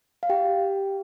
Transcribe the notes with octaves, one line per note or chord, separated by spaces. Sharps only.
F5
G4 G5